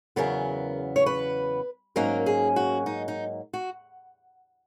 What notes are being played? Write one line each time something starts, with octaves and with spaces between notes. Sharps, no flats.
E2 C#3 F#3 B3 A#4
C#5
B4
G#2 F#3 A#3 C#4 A#4
G#4
F#4
D#4
D#4
F#4